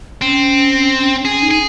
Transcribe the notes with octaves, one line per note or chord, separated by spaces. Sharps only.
C4 C#4
C#4 G#4
D#4
G#4